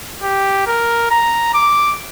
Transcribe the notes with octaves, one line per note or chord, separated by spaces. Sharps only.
G4
A#4
A#5
D6